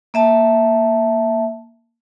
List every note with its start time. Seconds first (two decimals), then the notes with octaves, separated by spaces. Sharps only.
0.14 A#3 E5 A5